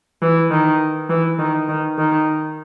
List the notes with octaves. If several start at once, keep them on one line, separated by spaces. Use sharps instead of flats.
E3
D#3
E3
D#3
D#3
D#3